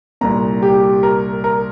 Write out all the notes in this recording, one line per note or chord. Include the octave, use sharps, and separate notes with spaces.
C2 A#2 A#5
G4
A#4
A#4